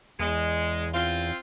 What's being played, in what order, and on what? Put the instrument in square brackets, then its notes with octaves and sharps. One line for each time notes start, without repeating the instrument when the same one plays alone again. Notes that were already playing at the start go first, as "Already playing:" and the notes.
[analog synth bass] E2 [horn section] G#3
[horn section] C4 F4